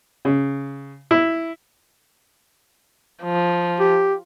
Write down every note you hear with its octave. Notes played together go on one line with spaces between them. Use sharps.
C#3
E4
F3
G4